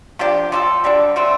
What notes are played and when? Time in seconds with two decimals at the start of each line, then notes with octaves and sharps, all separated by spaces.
0.19 C3 F3 D4 G4
0.52 F3 D4 A4
0.84 D3 G3 D4
1.16 D3 A3 C4